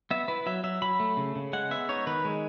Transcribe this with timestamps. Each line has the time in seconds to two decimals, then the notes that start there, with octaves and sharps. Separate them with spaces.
0.11 B3 E5
0.28 E4 B4
0.46 F#3 E5
0.64 F#3 E5
0.82 F#3 B5
1.00 A3
1.17 C#3
1.35 C#3
1.53 G#3 F#5
1.71 B3 E5
1.89 D#4 C#5
2.07 D#3 B4
2.25 G#3